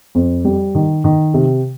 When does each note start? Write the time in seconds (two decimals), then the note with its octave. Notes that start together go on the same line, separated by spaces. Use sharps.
0.15 F2
0.45 G3
0.75 D#3
1.04 D#3
1.34 C3